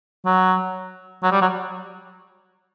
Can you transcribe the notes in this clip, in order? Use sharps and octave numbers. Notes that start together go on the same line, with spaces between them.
F#3
F#3
G3
F#3